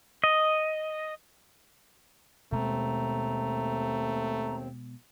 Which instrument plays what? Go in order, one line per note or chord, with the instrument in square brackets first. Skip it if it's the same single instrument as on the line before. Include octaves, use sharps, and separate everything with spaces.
[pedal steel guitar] D#5
[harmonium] D#2 C4 [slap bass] B2 G#3 [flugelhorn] A3 [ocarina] A#5